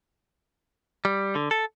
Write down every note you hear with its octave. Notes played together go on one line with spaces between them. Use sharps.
G3
D3
A4